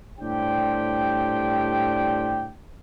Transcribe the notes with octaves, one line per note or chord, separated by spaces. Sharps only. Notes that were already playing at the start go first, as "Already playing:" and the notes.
A2 G3 D4 G4 C5 G5